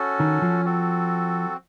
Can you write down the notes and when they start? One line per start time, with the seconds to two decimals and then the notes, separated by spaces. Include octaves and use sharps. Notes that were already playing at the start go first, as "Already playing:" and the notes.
Already playing: C#4 F#4 A4
0.20 D#3
0.42 F3
0.65 C4 F#4 A4